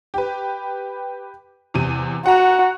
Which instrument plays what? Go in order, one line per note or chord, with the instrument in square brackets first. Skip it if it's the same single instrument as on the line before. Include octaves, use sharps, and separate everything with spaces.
[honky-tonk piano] G4 B4
E2 C3 D#7
[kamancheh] F#4 [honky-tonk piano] F#5 A#5